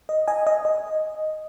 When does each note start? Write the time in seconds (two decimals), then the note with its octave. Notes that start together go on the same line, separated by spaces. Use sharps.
0.09 D#5
0.28 D#5 G#5
0.47 D#5
0.65 D#5